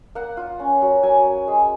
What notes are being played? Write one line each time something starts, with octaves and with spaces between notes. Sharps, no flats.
A#3 F#5
F4
C#4
F#3
F#3 G#5
F#3
G#3